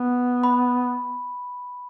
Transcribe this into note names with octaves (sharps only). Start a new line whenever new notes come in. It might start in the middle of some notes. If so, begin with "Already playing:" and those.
Already playing: B3
B5